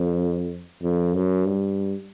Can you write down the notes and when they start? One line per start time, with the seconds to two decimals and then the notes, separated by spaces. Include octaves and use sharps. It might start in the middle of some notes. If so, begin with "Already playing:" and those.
Already playing: F2
0.82 F2
1.14 F#2
1.45 G2